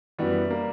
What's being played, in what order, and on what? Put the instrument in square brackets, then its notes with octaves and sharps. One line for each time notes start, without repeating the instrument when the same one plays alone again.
[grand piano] F#2 E3 B3 F#4 [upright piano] G3
[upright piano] A#3